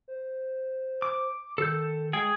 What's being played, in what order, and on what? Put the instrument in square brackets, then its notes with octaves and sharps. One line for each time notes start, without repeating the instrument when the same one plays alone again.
[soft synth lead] C5
[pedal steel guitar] D6
[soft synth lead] D#3 [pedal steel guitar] A4 G6
[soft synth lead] G#3 [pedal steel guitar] G#4 G5